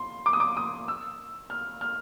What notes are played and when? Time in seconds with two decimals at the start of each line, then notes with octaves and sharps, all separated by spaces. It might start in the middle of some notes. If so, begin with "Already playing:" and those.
Already playing: C6
0.26 D6
0.33 D#6
0.40 D6
0.57 D#6
0.88 E6
1.50 F6
1.81 F6